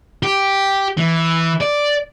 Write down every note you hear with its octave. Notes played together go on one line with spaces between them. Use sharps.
G4
E3
D5